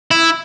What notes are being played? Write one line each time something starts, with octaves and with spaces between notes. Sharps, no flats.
E4